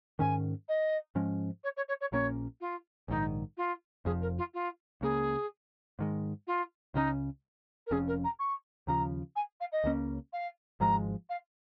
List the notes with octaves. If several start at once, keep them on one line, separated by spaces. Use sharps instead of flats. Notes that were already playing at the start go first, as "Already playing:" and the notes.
G#2 D#3 C#4 G#5
D#5
G#2 F3 G#3 C#4
C#5
C#5
C#5
C#5
A#1 A#2 A#3 C#4 C#5
F4
A#1 G#2 D#3 D#4
F4
F1 F2 F3 G#4
A#4
F4
F4
C#2 C#3 A#3 G#4
G#2 D#3 G#3
F4
C#2 C#3 F3 C#4 D#4
A#4
F1 F2 F3 C#4 G#4
A#4
A#5
C#6
D#2 C#3 F3 A#5
G#5
F5
D#5
C#2 C#3 A#3 C#4
F5
G#1 G#2 F3 G#3 A#5
F5